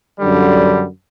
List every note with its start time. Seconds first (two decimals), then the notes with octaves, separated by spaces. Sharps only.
0.18 F#2 D3 G3